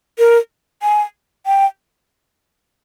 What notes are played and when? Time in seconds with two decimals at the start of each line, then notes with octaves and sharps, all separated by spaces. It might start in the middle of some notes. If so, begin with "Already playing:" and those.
0.18 A#4
0.82 G#5
1.46 G5